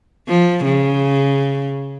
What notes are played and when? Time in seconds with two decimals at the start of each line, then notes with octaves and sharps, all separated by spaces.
0.28 F3
0.65 C#3